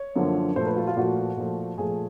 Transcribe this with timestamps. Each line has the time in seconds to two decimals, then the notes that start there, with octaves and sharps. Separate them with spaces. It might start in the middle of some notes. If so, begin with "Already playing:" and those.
Already playing: C#5
0.16 F#2 D3 F3 A#3
0.56 A#2 F3 A3 C5
0.66 B4
0.76 F4
0.87 F4
0.96 A#2 F3 A3 F#4
1.37 A#2 F3 A3
1.78 A#2 F3 A3 G#4